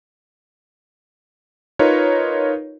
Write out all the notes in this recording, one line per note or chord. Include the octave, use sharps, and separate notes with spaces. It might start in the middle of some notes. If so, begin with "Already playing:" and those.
D#4 F4 A#4 B4 C#5